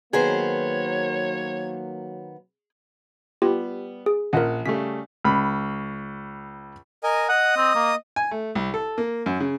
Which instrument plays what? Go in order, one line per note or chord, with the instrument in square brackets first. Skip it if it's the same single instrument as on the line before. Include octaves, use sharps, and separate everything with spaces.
[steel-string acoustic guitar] D#3 B3 C5 [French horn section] F#3 A#3 [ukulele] G#4 [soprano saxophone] C#5
[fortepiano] G3 B3 [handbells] F4 G4
[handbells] G#4
[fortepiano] A#1 F#5 [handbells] C#4 F4 A#4
[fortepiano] C#3 G3 A3 [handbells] B6
[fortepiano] C#2 B5
[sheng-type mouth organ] A#4 D#5 G#5
[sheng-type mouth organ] D#5 D#6 [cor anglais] F#5
[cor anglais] C4
A#3
[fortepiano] G#5
A3
C2
A4
A#3
F#2
C#3